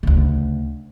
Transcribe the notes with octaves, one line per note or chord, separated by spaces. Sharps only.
D2 C#3